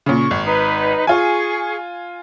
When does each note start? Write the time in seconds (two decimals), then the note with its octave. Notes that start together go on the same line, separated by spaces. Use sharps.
0.06 A#2 C#3 C#6
0.31 G#1
0.44 D#4 B4
1.07 F4 G#4 G#5 C#6